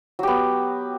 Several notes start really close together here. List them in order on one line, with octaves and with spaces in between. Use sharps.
F#3 G4 B3